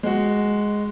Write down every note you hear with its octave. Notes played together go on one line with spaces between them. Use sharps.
G#3 F#4